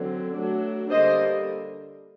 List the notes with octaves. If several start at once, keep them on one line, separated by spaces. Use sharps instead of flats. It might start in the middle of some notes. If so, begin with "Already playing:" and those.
Already playing: D3 F#3 C4
F#3 A3 D4
D3 G3 A#3 D4 C5 D#5